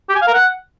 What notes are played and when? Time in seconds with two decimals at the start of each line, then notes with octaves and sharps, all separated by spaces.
0.10 G4
0.16 G#5
0.22 F5
0.28 A#4
0.34 F#5